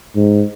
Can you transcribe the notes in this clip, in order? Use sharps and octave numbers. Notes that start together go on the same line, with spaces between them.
G#2